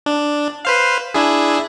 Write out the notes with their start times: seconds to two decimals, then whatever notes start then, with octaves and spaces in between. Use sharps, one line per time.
0.06 D4
0.65 B4 C5 F5
1.14 D4 E4 G#4